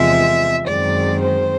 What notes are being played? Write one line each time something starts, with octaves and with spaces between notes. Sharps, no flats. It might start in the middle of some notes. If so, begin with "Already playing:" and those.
Already playing: E2 C3 F3 G#3 E5
F#2 D#3 G#3 C4 D5
C5